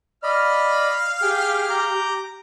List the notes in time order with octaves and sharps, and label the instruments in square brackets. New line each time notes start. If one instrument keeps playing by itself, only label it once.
[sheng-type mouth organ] D5 D#5 B5 [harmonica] F5 F6
[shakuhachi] G4 [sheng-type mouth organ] G#4 G5
[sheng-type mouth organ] A#5 D6 G6